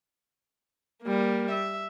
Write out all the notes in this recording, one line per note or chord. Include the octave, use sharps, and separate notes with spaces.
G3 A#3
E5